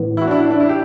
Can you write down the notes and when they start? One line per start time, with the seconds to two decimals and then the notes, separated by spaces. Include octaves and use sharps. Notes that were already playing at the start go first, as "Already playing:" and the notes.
Already playing: A2 E3 B3
0.17 E4
0.22 F#4
0.27 D4
0.31 E4
0.40 D4
0.51 D4
0.60 E4
0.69 G4